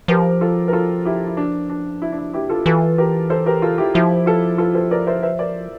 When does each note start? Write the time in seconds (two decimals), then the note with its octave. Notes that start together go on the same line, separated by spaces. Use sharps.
0.08 F3 G4 A#4
0.41 F4 A4
0.68 A#4
0.73 F4 A4
1.05 E4 G4
1.27 E4
1.37 D4
1.70 D4
2.02 E4
2.12 D4
2.18 E4
2.33 E4 G4
2.49 F4 A4
2.66 E3 F4 A4
2.98 G4 A#4
3.30 A4 C5
3.46 G4 A#4
3.62 F4 A4
3.78 E4 G4
3.94 F3 E4 G4
4.26 F4 A4
4.58 F4 A4
4.75 A4 C5
4.91 A#4 D5
5.07 C5 E5
5.23 C5 E5
5.39 A#4 D5